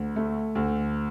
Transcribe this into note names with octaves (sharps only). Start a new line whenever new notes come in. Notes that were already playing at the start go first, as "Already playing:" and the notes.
Already playing: D2
A3
D2